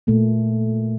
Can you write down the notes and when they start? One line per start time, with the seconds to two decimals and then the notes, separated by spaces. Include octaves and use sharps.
0.07 A#2 A3 A#3